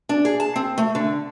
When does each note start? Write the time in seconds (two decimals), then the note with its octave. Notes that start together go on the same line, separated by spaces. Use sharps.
0.09 D4
0.25 G#4
0.40 A5
0.56 C4
0.78 A3
0.95 D3